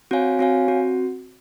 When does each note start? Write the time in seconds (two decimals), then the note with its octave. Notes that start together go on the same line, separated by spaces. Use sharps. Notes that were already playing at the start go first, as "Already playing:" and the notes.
0.11 C4 F#4 C#5 F5 G#5
0.39 C4 F#4 C#5 F5 G#5
0.68 C4 F#4